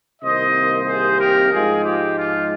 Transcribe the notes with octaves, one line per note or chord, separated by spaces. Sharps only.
C2 C3 D#3 A#3 C5 D#5
G#4 C5
G4 A#4
G#2 F3 G#3 F4 G#4
G4
F4